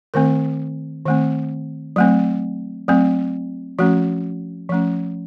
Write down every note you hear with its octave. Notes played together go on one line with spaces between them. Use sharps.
D#3 A3 C4 A#4
D#3 A3 C4
F#3 A3 C4
F#3 A3 C4
F3 A3 C#4 F#4
F3 A3 C#4